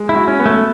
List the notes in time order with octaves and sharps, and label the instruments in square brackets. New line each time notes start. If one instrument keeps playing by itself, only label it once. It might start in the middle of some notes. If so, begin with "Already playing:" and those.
Already playing: [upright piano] G#3
[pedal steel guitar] E4
[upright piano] F#4
[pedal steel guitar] C#4
[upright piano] B3
[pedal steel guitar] A3